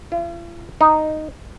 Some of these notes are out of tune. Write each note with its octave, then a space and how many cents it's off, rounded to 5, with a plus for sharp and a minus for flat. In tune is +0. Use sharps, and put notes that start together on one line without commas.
F4 -45
D#4 -5